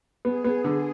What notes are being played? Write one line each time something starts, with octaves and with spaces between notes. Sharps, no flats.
B3 G#4
B3
D3